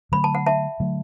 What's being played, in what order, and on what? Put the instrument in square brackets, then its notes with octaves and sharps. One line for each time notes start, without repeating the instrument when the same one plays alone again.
[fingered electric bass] D3 F#3 A3 [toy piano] B5
[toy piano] A5
F#5
E5 A5
[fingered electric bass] D3 F#3 A3